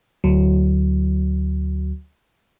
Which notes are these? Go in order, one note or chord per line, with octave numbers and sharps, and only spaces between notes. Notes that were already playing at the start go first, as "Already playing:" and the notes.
D2 F#3